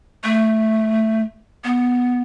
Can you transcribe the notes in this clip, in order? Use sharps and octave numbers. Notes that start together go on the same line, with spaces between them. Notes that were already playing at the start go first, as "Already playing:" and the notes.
A3
B3